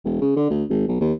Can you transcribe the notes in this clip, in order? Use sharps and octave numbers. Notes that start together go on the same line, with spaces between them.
E1
C#3
D3
D2
G#1
B1
D#2